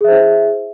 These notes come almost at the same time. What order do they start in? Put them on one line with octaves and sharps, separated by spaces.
G#4 E5 C5 E4